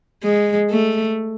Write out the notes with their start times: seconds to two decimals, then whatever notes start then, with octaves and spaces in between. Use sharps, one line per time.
0.23 G#3
0.70 A3